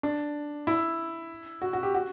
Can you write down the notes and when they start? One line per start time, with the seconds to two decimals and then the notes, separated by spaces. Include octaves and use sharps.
0.03 D4
0.67 E4
1.62 F#4
1.73 F#4
1.83 G4
1.95 F#4